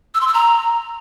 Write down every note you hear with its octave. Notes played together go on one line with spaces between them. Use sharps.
E6
C6
E6
A#5